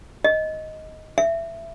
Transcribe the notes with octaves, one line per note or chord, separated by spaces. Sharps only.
D#5
E5